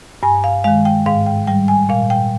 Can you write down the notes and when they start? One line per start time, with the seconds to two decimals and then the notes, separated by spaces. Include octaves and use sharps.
0.23 G2 G#5
0.44 F5
0.64 D#3 G#3 F5
0.85 G5
1.06 G#2 F5
1.26 G5
1.47 G3 G5
1.68 G#5
1.89 A#2 F5
2.10 G5